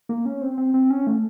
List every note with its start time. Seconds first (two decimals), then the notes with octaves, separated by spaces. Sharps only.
0.09 A#3
0.25 C#4
0.42 C4
0.58 C4
0.74 C4
0.90 C#4
1.07 A3